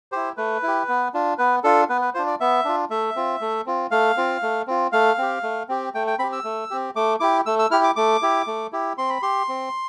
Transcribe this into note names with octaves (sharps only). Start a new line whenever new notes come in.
E4 G4 C5
A3 B4
E4
G4
B3
D4 F4
B3 B4
D4 F4 A4
B3 B4
B4
D4 F4 C5
D5
B3 E5
D4 F4
A3 E5
C4 F4
A3
C4 F4
A3 F5
C4 F4
A3
C4 F4
A3 F5
C4 G4
A3
C4 G4
A3 G5
G5
C4 G4 B5
E6
A3
C4 G4
A3 D6
E4 G4 D6
A3 E6
E6
E4 G4 F6
D6
A3 D6
E4 G4
A3
E4 G4
C4 C6
B5
G4 C6
C4